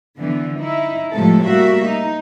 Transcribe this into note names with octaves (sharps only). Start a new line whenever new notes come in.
D3 E3 B3
D#4 E4
A2 C3 F3 G#3 A3 A4
G3 A#3 F#4 E5
D#4